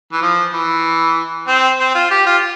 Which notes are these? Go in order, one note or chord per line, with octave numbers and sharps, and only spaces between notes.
E3
F3
E3
C4
C4
F4
G4
F4